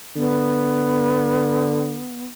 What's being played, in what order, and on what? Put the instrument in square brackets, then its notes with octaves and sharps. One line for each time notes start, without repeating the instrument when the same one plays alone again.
[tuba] D3 [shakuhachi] B3